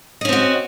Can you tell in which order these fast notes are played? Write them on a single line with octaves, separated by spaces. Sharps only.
D#5 C#4 C4 F#4